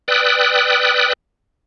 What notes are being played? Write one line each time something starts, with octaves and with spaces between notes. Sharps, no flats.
B4 D5 G5 D#6 E6 F#6